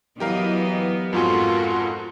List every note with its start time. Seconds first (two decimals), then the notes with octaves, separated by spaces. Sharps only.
0.20 E3 F#3 B3 G4 A#4 D#5 F5
1.13 F2 G#2 F4 F#4 A4 A#4 G#5